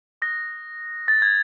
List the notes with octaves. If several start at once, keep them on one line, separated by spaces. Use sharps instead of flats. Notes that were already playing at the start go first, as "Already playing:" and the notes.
D#6 F#6 A#6
D#6 F#6 A6
G#6